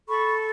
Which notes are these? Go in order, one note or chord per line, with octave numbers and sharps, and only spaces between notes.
A4 B5 C#6